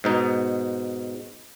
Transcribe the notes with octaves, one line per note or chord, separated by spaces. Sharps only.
G#2 B2 D#4